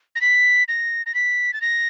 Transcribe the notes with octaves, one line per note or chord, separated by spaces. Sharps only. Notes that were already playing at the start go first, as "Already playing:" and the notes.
A#6
B6
A#6
A#6
B6
A6
A#6